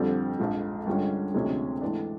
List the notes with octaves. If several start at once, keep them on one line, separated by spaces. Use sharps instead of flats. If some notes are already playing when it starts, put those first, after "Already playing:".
Already playing: F2 D3 G3 C4
A#1 G#2 F3
G2 D3 F3 G#3 C#4
D2 C3 F3 G#3 C#4
G#2 E3 A3 D4